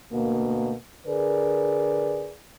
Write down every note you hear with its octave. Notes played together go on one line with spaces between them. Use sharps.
D2 B2 A#3
D3 G#4 A#4 B4 D5